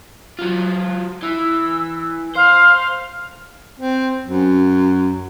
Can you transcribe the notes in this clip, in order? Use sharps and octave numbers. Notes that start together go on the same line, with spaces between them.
F#3 F4
E3 E6
C5 F5
C4
F#2